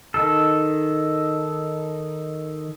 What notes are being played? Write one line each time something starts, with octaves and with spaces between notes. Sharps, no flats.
D#3 D#4 A4